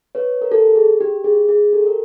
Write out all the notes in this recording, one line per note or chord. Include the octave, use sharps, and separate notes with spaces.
B4 C#5
A#4
G4 A4
G#4
G4
G#4
G#4
G4 A4
A#4